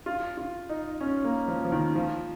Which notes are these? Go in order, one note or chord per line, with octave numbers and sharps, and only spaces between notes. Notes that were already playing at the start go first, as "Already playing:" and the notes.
F4
F4
D#4
C#4
A#3
F3
F3
D#3
F3